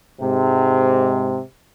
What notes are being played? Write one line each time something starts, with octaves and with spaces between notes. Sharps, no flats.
G#2 C3